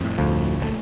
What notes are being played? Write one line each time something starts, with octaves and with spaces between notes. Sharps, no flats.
F2 A2
D2 F3
A#1 C#3 A3